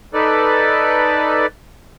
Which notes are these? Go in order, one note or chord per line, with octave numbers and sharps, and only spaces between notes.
D#4 A4 B4 D5